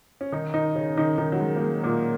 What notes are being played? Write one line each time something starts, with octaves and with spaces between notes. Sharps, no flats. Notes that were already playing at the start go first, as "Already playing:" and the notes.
C#4
D#3 D#4
D#3 D#4
C#3 C#4
D#3 D#4
D#3 D#4
F#3
G#3
A#3
G#3
A#2 A#3